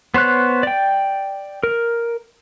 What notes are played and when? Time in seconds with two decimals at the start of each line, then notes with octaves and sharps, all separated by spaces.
0.14 B3 C5 C#5 F#6
0.63 D5 G5
1.63 A#4